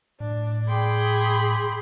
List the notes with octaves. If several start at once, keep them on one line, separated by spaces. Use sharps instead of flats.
A2 D4
G#4 G5 B5 C6 D6